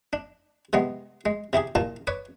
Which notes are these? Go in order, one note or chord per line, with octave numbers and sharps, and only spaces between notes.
D4
C3 G3 G#3 B3
G#3
C3 E4 G4 G#4
C2 A#2 F4 A5 A#5
B4 C#5 D5